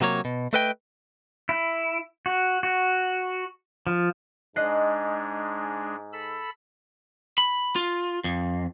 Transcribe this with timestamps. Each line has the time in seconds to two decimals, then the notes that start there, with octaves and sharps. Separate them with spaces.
0.01 C3 F#3 A#3 C#5
0.25 B2
0.53 A3 A4 B4 D#5 G5
1.49 E4
2.26 F#4
2.63 F#4
3.87 F3
4.56 G#2 G#3 D4 D#5 F#6 C7
6.13 A4 B5 E6
7.38 B5
7.76 F4
8.24 F2